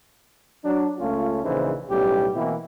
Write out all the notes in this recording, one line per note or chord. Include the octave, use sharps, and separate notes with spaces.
F#3 D4
C#2 A3 C#4 F4
A#1 C#3 E3 D#4 C5
B1 A2 G3 C#4 G4
B2 E3 A#3 C4 E4